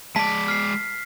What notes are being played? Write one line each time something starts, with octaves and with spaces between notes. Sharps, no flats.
G#3 D5 A5 B6
F6 C7